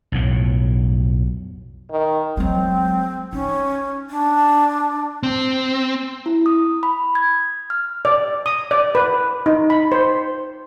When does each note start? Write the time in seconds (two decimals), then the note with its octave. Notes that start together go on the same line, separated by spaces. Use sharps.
0.12 B1 F2 A2
1.91 D#3
2.37 F#3 G#3 C4
3.33 C#4 D#4
4.10 D4
5.23 C4
6.26 E4
6.46 D#6
6.83 B5
7.15 G#6
7.70 F6
8.05 D5
8.46 D#6
8.71 D5
8.95 B4
9.46 D#4
9.70 B5
9.92 C5